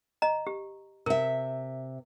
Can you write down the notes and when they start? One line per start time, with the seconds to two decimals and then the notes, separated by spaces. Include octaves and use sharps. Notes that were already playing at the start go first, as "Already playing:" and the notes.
0.22 D#5 A#5
0.47 G4
1.06 C3 A#4 E5